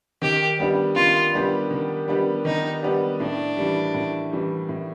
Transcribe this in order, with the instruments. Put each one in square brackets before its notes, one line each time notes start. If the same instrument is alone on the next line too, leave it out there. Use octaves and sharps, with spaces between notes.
[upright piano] D#3 [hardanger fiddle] G4
[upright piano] G3 B3 D4 G4
[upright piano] D#3 [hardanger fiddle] F4
[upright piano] G3 B3 D4 G4
D#3
G3 B3 D4 G4
[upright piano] D#3 [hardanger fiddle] D#4
[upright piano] G3 B3 D4 G4
[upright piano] A2 [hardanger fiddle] D4
[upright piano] E3 G3
A2
E3 G3
A2